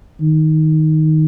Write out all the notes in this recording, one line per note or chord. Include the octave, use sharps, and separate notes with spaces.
D#3